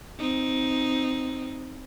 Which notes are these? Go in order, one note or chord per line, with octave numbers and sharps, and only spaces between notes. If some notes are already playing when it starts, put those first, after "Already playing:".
C4 D#4